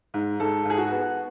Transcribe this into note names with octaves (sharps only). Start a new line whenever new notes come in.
G#2
G#2 A4
G#2 G#4
F#4
B3